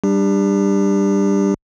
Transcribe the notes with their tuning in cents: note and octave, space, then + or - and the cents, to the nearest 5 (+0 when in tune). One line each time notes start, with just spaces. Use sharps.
G3 +0 D4 +25 G4 +30